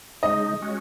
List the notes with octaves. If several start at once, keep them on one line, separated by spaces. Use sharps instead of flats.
C#3 G#3 D#4 D#5
G#3 C#4 F#4